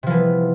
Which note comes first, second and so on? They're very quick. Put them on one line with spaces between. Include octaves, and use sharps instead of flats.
C3 F3 E3 B3